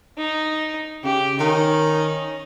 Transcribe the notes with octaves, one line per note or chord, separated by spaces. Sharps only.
D#4
C#3 G4
D#3 C#4 D#4